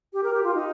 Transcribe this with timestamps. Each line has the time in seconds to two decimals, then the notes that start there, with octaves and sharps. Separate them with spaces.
0.13 G4
0.23 A#4
0.33 G4
0.43 F4
0.54 D#4